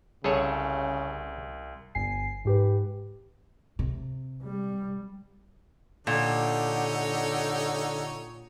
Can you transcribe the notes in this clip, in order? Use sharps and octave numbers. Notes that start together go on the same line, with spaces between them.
C2 C#3 G#4 A4 C#5
G1 G2 G#5 C7
G#2 G4 B4
C3
G3
A#2 D3 D#4 G4 C#5